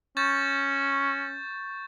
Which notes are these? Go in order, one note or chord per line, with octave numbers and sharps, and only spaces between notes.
C#4 C#6 G6 A6